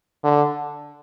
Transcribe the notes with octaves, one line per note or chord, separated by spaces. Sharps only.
D3